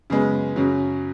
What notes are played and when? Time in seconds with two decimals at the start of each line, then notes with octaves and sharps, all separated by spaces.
0.10 F#2 C#3 G#3 B3
0.56 F#2 C#3 F#3